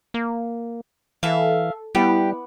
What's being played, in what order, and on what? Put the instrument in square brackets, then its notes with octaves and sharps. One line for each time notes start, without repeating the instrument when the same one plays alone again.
[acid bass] A#3
[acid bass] E3 [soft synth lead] A4 [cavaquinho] E5 F5
[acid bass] G3 [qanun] B3 [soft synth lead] E4 [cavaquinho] G4